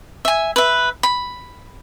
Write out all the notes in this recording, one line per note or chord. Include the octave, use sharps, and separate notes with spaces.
E5 G#5
B4 E5
B5